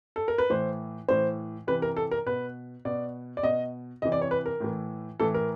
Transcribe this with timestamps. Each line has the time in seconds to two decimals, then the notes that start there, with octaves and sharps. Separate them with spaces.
0.16 A4
0.28 A#4
0.38 B4
0.50 A2 E3 C5
1.08 A2 E3 C5
1.67 C3 E3 B4
1.82 A#4
1.97 A4
2.11 A#4
2.26 B2 B4
2.85 B2 D5
3.37 D5
3.43 B2 D#5
4.02 C3 E3 D#5
4.12 D5
4.22 C#5
4.31 B4
4.46 A#4
4.60 A2 E3
5.20 A2 E3 A4
5.34 A#4